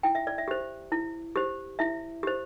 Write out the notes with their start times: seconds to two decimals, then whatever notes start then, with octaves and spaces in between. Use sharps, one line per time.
0.03 E4 G5
0.15 E5
0.27 D5
0.38 E5
0.48 G4 C5
0.92 E4
1.36 G4 C5
1.79 E4 E5
2.23 G4 C5